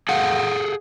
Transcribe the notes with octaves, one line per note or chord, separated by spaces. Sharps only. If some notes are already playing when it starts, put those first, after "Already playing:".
G#4 A4 F5 F#5